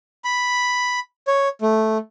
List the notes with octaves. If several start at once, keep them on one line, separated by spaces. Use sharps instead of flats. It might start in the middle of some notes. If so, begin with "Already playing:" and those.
B5
C#5
A3